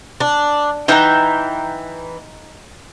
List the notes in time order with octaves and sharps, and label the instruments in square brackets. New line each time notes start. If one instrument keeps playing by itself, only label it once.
[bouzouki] D4
[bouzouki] E3 E5 G5 [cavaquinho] D#4 F#5 A#5